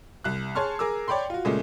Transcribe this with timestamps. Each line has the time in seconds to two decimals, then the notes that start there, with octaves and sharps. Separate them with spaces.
0.24 C2 F#6
0.55 G#4 C#5 A5 C6 C#6 F6
0.79 G#4 A#4 D6 E6
1.08 C#5 D5 G5 B5 C6
1.30 F4 F#4
1.45 A#2 C#3 G#3 A3